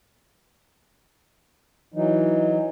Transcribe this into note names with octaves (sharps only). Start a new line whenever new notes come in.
E3 F#3 D#4